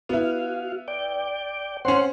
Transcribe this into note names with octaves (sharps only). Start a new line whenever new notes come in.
B3 E4 F#4 F5
D5 G5
C4 C#4 C#5 F#5 C6